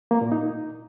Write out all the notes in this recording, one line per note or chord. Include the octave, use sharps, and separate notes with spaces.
A#3
A#2
D#4